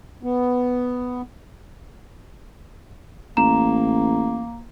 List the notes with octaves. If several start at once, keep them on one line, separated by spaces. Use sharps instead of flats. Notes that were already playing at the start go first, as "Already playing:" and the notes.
B3
A1 A#3 A#5 E7